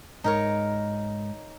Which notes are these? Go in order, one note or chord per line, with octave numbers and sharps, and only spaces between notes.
G#2 D#4 A#4 C#5